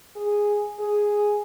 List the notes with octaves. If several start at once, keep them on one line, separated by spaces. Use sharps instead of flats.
G#4
G#4